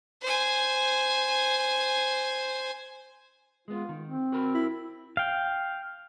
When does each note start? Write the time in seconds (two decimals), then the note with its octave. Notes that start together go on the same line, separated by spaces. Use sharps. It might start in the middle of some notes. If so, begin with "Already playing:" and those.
0.22 C5 G#5
3.68 G#3 B3 F4
3.89 D#3
4.07 C4
4.32 F#4 A#4 B5
4.54 E4
5.17 F5 G5